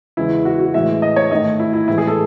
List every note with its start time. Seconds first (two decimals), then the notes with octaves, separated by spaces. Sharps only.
0.17 E2 C#3 G#3 E4
0.45 F#4
0.59 F#4
0.74 A2 E3 G#3 E5
1.02 D#5
1.16 C#5
1.31 G#2 D#3 A3 D#5
1.59 E4
1.73 E4
1.88 A2 E3 G#3 E4
1.98 G#4
2.07 A4